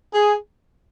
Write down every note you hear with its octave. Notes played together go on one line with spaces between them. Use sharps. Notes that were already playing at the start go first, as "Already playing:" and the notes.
G#4